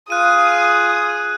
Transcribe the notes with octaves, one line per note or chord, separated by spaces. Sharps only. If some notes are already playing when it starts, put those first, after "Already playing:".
F4 G#4 D#6 F#6 D#7